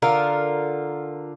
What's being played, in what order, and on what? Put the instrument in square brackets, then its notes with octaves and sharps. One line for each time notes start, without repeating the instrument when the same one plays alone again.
[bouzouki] D3 F4 A#4